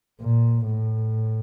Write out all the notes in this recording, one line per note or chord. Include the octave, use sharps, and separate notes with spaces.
A#2
A2